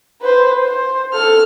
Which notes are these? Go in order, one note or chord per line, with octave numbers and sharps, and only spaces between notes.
B4 C5
C5
A4 F6